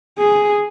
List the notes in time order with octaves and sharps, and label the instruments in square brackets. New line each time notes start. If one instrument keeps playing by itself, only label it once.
[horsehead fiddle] G#4